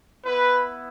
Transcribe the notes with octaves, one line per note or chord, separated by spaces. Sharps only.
B3 E4 B4